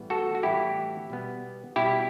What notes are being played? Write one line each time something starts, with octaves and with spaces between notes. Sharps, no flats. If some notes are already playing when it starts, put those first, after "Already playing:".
Already playing: A2 E3 G3 B3
F#4 A4
F#4
A2 E3 G3 B3 E4 G4
B2 G3 B3
B2 G3 B3 E4 G4